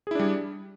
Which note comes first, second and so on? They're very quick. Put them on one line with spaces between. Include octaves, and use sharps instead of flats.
G#4 E4 D4 G3